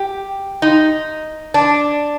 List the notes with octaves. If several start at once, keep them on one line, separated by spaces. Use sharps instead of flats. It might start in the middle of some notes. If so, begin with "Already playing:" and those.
Already playing: G4
D#4
D4